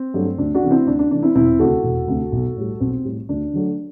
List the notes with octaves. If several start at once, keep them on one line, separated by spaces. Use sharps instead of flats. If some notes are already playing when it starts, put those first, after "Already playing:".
Already playing: C4
G2 F#3 A3
D2 D4
D4 F#4
C3 E3 A3
C4 E4
D2 D4
D4
C3 E3 A3 D4
C4 E4
E1 C4 E4
D2 C3 F#4 A4
E1
D2 C3
B1
A2 G3
B1 C4
A2 G3
D2 D4
D3 F#3 A3